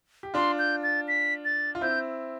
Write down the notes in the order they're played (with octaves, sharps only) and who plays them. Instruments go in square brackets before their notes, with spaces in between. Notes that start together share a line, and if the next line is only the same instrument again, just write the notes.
[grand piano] G4
[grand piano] D4 F4 [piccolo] C6
[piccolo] G6
A6
B6
A6
[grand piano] F4
[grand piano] C4 E4 [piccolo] G6